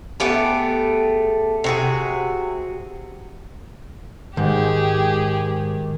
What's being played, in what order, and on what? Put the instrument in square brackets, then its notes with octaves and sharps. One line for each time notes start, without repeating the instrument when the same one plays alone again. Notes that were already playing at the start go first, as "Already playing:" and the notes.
[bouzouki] A3 B3 G4 G#4
C3 F#4 G#4
[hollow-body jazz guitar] G#2 [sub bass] D#3 [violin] G4 G#4